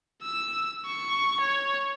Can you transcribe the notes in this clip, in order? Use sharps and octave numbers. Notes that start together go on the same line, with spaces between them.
E6
C#6
C#5